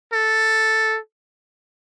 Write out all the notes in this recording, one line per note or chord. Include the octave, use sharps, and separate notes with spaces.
A4